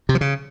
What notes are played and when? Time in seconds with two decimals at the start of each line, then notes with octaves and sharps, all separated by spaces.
0.09 C3
0.15 F3
0.21 C#3